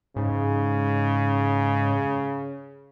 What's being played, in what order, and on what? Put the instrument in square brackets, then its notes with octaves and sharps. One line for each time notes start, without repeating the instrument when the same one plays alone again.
[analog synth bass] G#2 [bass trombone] C#3